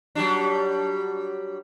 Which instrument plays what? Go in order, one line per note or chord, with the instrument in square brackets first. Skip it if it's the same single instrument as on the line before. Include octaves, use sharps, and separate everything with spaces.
[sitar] F#3 G3 D4